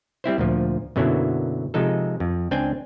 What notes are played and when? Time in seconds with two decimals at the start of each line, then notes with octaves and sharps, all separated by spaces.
0.24 G3 C4 E4 C5
0.38 D2 A#2 F3
0.96 F#2 B2 D3 F#3 A#3 E4
1.74 C3 F3 G#3 D#4 A4
2.20 F2
2.51 C#2 C4 D4 G5 G#5